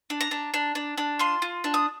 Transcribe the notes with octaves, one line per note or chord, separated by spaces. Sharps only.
D4
A#5
D4
D4
D4
D4
F4 C6
F4
D4
D#6